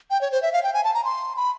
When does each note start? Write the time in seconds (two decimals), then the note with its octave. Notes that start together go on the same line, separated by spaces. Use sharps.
0.11 G5
0.21 C#5
0.32 C5
0.42 E5
0.53 F5
0.64 G5
0.74 G#5
0.84 A5
0.94 A#5
1.05 C6
1.37 B5